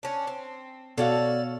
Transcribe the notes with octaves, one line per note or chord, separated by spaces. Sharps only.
C#4 D4
C4
B2 F#4 A4 C#5 D5 F5